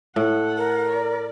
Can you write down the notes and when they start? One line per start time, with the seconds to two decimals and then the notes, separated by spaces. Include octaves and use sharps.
0.16 A2 A4 F#5
0.57 A#4
0.88 D5